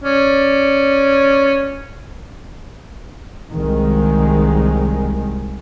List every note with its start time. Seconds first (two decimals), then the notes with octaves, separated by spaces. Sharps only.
0.04 C#4 D5
3.52 C2 D#3 G#3